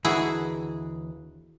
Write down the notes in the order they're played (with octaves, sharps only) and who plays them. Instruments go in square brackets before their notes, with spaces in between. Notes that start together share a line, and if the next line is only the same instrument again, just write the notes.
[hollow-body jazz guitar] D#2 D3 E3 [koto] E4 F#4 G#4